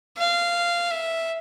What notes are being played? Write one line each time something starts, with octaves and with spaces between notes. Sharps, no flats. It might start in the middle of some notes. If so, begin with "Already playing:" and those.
F5
E5